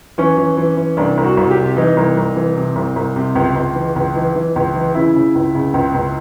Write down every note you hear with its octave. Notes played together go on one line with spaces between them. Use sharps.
E3 C#4
E3
E3
E3
C2 D4
C2
F#4
C2
G4
C3
E3 D#4
C2
C2
E3
C3
C2
C2
C3
C#2
C#2
E3
C#2
E3
E3
C#2
E3
C#3 E4
C#3
C#2
C#3
C#2
C#2